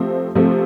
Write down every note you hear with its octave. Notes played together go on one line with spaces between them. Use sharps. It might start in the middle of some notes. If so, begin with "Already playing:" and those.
Already playing: C3 F3 A3 C4
C3 F3 A3 C4